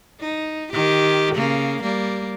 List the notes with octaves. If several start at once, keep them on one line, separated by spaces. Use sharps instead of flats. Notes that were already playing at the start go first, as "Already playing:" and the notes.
D#4
D#3 G4
C#3 A#3
G3 A#3